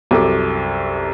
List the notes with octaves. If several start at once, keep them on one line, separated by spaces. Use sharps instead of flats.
C2 F#2 A4 D6